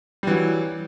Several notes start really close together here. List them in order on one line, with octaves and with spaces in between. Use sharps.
G3 E3 F#3